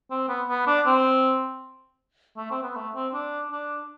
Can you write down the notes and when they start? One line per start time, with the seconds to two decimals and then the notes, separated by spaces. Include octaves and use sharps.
0.11 C4
0.29 B3
0.49 B3
0.67 D4
0.87 C4
2.37 A3
2.51 C4
2.63 B3
2.75 A3
2.95 C4
3.14 D4
3.52 D4